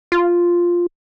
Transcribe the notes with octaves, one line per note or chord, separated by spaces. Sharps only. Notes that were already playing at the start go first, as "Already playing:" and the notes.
F4